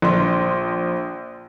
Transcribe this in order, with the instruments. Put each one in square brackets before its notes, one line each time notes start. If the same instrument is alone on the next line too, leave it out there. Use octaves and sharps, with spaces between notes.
[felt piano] A#1 C6